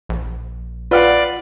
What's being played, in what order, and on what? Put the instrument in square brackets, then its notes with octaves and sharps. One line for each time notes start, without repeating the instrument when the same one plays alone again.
[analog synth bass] A#1
[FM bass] F4 [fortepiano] B4 F5 F#5 [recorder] D5